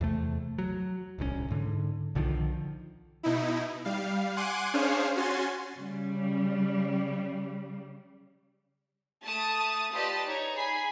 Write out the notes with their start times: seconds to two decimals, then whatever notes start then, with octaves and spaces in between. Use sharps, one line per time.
0.01 E2 C3 A3
0.58 F#3
1.19 D1 C2 D3 C#4
1.50 G#2 D3
2.15 B1 D3 D#3 F3
3.23 B2 D#4 E4
3.85 G3 F5
4.36 F#5 G#5 C6 D6 F#6 D#7
4.74 C#4 D4 G#4 C5 C#5 F5
5.16 C#4 F#4 G#5 C6 A6
5.76 C#3 G3
9.23 A3 A5 D#6
9.94 F4 G4 B4 D5 D#5 A5
10.26 D#4 C#5
10.55 G#4 G#5 B5 C7